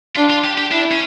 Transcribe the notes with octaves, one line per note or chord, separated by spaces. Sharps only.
D4 F4
F4
G4
G4
D4 E4
C#4